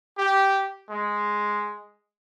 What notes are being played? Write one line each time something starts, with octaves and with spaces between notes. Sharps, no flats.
G4
G#3